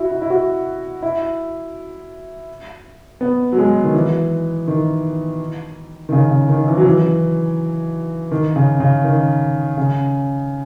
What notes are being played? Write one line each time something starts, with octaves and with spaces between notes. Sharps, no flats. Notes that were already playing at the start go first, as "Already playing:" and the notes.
Already playing: E4 F#4
E4
E4
F#4
E4
B3
F#3
G#3
D#3
E3
D#3
D#3
C#3
C#3
D#3
E3
F#3
E3
D#3
C#3
C#3
D#3
C#3